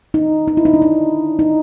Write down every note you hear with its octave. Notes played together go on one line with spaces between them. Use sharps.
D#4
D#4
E4
D#4
D4
D#4
D#4